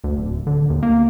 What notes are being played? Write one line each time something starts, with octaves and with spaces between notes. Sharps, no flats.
D2
D1
D3
D#2
A#3